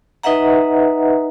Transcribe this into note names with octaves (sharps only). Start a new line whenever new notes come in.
D#4 B4 D#5 E5 F#5 A#5